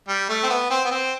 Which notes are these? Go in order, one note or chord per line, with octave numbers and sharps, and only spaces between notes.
G3
A3
C4
B3
C4
B3
C4